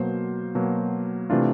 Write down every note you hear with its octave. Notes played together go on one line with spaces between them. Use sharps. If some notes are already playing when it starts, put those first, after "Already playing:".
Already playing: B2 F#3 A#3 C5
B2 F#3 A#3
C3 E3 A3 D4 F4